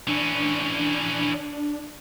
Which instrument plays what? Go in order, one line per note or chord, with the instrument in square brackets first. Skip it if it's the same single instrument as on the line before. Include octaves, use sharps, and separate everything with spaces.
[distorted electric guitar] E3 C#4 [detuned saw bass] D4